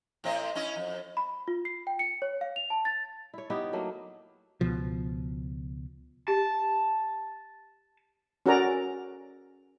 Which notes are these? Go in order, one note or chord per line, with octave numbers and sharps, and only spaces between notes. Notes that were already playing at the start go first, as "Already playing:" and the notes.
A2 C4 D#5
C#4 E4 D#5
F2
B5
F4
C7
G5
C#7
C#5
F5
F7
A5
A6
E4 C#5
B3 D#4 E4 G4
F#3 A3 A#3
C#2 B2 F3
G4 A5
C#4 F#4 A4 A#4 D5 A#5